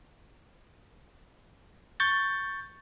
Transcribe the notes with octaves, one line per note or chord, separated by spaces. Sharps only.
C#6 G6 A6